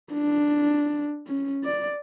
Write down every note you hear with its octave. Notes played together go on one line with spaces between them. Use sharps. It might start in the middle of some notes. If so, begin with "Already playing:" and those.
D4
C#4
D5